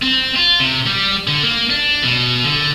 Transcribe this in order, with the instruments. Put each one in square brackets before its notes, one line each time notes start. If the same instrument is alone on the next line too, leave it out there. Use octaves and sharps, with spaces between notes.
[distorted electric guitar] C4
F4
C3
G3
D3
A#3
D4
B2
D3